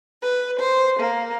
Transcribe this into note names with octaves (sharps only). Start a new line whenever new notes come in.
B4
C5
A#3